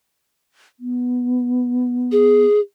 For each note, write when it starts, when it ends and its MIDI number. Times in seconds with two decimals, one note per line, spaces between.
0.80 2.46 59
2.12 2.60 68